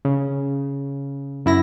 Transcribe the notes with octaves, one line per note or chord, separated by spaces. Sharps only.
C#3
F#2 E4 A#6